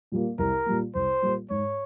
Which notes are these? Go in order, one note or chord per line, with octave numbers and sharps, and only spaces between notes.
A#2 G3 A#3
C2 A#4
A#2 G3 A#3
C2 C5
A#2 G3 A#3
G#2 C#5